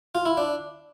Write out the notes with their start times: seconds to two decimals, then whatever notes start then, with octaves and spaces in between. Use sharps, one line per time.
0.15 F4
0.25 E4
0.37 D4